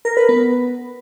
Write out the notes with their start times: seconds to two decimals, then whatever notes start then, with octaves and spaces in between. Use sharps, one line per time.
0.05 A#4
0.17 B4
0.29 B3